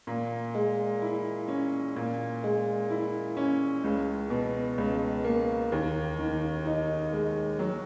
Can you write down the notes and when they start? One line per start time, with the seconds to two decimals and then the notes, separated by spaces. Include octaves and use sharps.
0.07 A#2
0.54 G#3
1.02 E4
1.48 C#4
1.96 A#2
2.43 G#3
2.90 E4
3.37 C#4
3.84 C#2
4.30 B2
4.78 C#2
5.24 A#3
5.72 D#2
6.19 D#3
6.65 D#4
7.12 G#3
7.59 F#3